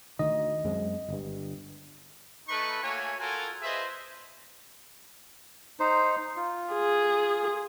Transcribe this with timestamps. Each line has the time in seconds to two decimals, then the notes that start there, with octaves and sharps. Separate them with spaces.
0.19 D2 D#3 D#5
0.64 F#2 G#3 C4
1.08 G1 G2
2.49 A3 D#4 A4 B4 B5 C#6
2.82 A3 A#3 F#4 C#5 G#5
3.18 F4 F#4 A4 A#4 G#5
3.62 F4 G#4 B4 C5 D#5 E5
5.80 D#4 C5
6.37 F4
6.73 G#4